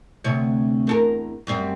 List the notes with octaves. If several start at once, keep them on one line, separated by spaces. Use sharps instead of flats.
D2 C3 C#5
E2 A4 A#4
F#2 G3 C4